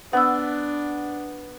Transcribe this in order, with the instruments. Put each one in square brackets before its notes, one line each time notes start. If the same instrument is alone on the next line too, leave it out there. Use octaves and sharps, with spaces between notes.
[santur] B3 [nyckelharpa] D4 [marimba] F#5 E6